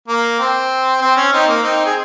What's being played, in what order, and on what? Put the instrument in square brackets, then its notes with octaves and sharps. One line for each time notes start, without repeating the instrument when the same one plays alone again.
[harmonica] A#3
C4
C4
C#4
C4 D#4
A#3
C4 D#4
G#4